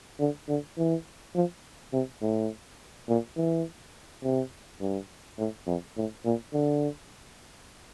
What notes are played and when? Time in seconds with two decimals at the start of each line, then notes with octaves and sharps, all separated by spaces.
0.20 D3
0.48 D3
0.78 E3
1.35 F3
1.93 C3
2.22 A2
3.09 A#2
3.37 E3
4.24 C3
4.81 G2
5.38 A2
5.67 F2
5.97 A2
6.25 A#2
6.53 D3